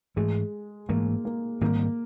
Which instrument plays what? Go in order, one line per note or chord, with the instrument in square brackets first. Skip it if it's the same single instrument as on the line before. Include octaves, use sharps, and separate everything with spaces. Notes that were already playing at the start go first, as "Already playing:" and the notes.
[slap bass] G#2 E3 A3 [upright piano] G#3
[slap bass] G#2 E3 A3 [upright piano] A#3
[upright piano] A#3
[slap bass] G#2 D#3 G3 C4 [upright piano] A#3